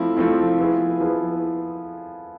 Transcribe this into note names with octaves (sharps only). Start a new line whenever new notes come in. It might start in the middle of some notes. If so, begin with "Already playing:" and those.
Already playing: F3 A3 C4 E4
F3 A3 C4 E4
F3 B3 E4 G#4
F3 B3 E4 G#4